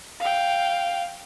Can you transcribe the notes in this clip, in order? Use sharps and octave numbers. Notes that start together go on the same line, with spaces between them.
F5 G5